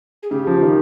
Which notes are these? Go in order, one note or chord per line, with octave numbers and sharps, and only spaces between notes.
G#4
C#3 G4
F3
D#3